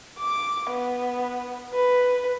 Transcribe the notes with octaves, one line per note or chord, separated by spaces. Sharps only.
D6
B3
B4